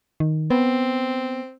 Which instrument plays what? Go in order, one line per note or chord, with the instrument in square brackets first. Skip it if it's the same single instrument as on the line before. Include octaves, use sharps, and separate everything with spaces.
[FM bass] D#3
[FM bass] B3 [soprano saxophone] C4